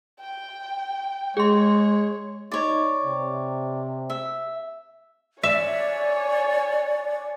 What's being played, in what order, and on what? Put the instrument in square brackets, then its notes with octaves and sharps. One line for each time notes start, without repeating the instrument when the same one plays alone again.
[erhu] G5
[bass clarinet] G#3 [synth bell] G#4 C6 [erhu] C#5
[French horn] D#4 [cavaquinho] C#5 D5
[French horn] C3
[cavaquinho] E5
[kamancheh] C#5 G#5 [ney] D5 [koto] E5